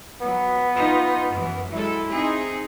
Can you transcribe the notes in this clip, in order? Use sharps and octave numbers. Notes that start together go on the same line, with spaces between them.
F#3 B3
D#4 F4
F#2 E3
F#3 G#3 E4 A4
C4 D#4 G#4